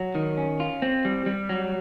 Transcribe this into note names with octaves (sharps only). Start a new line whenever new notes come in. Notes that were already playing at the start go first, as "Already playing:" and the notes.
Already playing: F#3
D#3
C#4
F4
C4
G3
G3
F#3